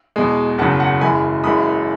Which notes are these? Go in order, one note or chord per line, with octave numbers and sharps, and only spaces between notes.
E2 B2 G#3
F#1 E2 C#3 F#3 F#5 A5
F#5 A5
F#1 F#2 E3 G#3 G#5 B5
F#1 F#2 E3 G#3 B5 D#6